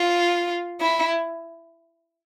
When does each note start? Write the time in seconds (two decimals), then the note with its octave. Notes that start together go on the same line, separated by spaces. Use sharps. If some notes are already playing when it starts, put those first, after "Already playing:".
Already playing: F4
0.81 E4